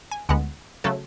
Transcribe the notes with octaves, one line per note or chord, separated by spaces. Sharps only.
G#5
D2 D3 G#3 B3 F#5
C#3 F#3 A3 A4